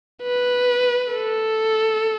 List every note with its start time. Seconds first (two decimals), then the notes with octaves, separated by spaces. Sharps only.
0.23 B4
1.13 A4